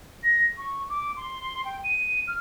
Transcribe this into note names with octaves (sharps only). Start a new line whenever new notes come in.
A#6
C#6
D6
C6
G5
D#7
F6